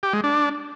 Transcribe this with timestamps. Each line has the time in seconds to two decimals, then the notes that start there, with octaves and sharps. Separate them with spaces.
0.03 G4
0.13 G#3
0.24 D4